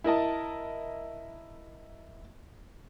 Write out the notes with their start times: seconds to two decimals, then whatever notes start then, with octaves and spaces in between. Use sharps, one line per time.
0.04 E4 A#4 D#5 A5